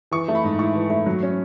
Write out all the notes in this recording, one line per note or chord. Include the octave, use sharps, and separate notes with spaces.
E3 C#6
A3
B5
G#2
E4 C#6
E3
A3
F#3
C#4